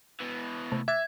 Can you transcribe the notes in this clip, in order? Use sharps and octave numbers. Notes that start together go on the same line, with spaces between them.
B2 E3
C3 A3
E5 D6 F#6 G#6 A6